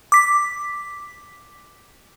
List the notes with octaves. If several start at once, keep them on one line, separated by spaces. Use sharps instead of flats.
D6 B6